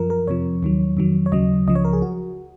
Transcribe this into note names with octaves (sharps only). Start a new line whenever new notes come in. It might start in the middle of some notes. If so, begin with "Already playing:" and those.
Already playing: F#2 F3 A#4
A#4
F2 C3 F3 C#5
D#2 D#3 F#3
F2 D#3 F#3
C#5
D#2 C#3 F#3 D#5
C#2 C#3 F3 D#5
C#5
A#4
G#4
F#4